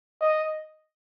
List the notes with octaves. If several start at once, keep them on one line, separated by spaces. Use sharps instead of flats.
D#5